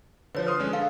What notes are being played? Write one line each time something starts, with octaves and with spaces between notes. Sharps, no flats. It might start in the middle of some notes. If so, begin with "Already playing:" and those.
D3 F3 B4 C#5
C6 D#6 F6
G#3 C#4 D4
A4 F5